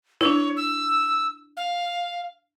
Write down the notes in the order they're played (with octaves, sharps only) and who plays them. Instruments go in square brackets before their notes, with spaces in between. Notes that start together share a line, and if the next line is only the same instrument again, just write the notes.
[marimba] D4 E4 [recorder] C#5
[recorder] E6
F5